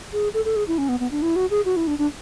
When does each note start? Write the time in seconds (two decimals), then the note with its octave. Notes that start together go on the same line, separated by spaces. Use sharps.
0.13 G#4
0.34 A4
0.45 A4
0.56 G#4
0.68 E4
0.78 C#4
0.89 B3
1.00 B3
1.11 D4
1.22 E4
1.36 F#4
1.51 G#4
1.65 F#4
1.76 E4
1.87 D4
1.99 D4